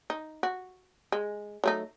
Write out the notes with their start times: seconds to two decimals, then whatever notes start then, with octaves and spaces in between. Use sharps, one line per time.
0.10 D#4
0.43 F#4
1.12 G#3
1.64 F#3 A3 D#4